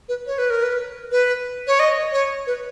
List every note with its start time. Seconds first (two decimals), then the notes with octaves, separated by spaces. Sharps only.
0.09 B4
0.26 C#5
0.38 B4
0.50 A#4
0.63 B4
1.11 B4
1.67 C#5
1.79 D#5
2.12 C#5
2.47 B4